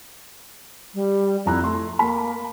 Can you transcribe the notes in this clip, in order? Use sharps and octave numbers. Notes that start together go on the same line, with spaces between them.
G3
F2 E4 A#5 F#6
A3 C6
A#3 B5